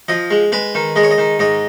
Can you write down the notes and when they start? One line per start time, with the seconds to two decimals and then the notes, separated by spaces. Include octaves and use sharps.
0.08 F3 D#5
0.31 G#3
0.52 G#3 B4
0.75 D#3
0.96 G#3 D#5
1.03 C#5
1.11 D#5
1.18 D#3
1.39 G#2 D#5